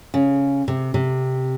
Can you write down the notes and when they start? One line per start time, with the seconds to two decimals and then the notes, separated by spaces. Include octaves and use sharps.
0.14 C#3
0.68 C3
0.94 C3